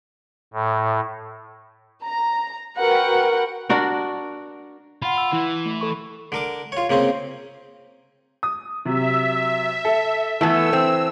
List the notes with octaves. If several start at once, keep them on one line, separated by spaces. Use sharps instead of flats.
A2
A#5
F#4 A#4 B4 F#5 G5
D4 F#4 A#4
F4 F#5 B5
E6
E3 E4
A3
A4 B5 C#6
D3 A#4 D6
F4 C#5
C#3 A#3 C4 C#4
D#6
C3 F#3 E5
A4
E3 A3 B3 A5 E6 G#6
C4